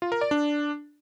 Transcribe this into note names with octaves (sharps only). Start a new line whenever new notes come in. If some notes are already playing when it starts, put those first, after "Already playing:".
F4
A#4
D5
D4